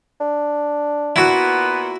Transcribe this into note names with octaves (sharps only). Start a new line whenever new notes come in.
D4
A#2 B3 E4 F#4